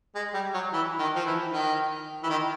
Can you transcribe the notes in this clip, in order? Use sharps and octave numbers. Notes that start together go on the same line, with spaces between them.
G#3
G3
F#3
E3
D#3
F3
E3
D#3
E3
D#3